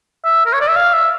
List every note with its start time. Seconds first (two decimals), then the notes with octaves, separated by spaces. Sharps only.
0.25 E5
0.46 A#4
0.53 C#5
0.61 D5
0.69 E5
0.76 F5
0.94 E5